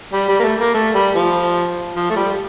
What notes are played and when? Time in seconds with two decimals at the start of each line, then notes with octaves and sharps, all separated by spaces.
0.13 G3
0.29 G3
0.39 A#3
0.43 A3
0.60 A#3
0.74 A3
0.94 G3
1.15 F3
1.96 F3
2.10 A3
2.16 G3